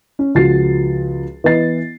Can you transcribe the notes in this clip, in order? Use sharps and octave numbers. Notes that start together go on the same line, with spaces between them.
C#4
C#2 F3 F#4 A6 C7
E3 B3 D#5 A6 C7